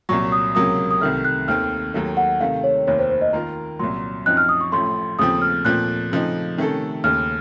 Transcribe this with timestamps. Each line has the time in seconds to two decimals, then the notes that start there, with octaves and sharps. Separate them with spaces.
0.09 C2 A#2 F#3 C#6
0.32 D#6
0.55 C#2 C3 F#3 A#3 D#6
0.91 D#6
1.01 C2 C3 D#3 A3 F6
1.25 F#6
1.48 D#2 D#3 A3 C4 F6
1.94 D#2 D#3 F#3 A3
2.17 F#5
2.41 C3 D#3 A3 F5
2.64 C#5
2.87 F1 D#2 D#3 C#5
2.98 C5
3.10 C5
3.21 D#5
3.33 D#3 A#3 F4 A#4 A#5
3.79 C2 A#2 F#3 C6
4.26 F#2 F3 C4 D#4 F#6
4.37 F6
4.49 D#6
4.61 C#6
4.72 A1 A2 F3 A3 C6
5.19 D#2 C#3 F3 A3 C4 D#6
5.42 F6
5.65 A#2 F3 A3 C4 F#6
6.11 C#3 F3 A3 C4 D#4
6.58 C3 D#3 A3 C#4 A4
7.04 D#2 C#3 A3 F6